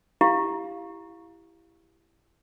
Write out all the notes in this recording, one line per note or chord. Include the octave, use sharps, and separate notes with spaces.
E4 G4 F5